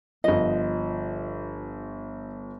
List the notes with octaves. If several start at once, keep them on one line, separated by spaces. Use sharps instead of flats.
G1 F3 D#5